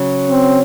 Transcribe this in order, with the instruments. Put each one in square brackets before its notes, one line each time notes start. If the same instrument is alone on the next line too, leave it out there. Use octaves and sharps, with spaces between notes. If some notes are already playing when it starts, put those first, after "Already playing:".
Already playing: [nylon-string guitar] C#3 F#3
[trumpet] C4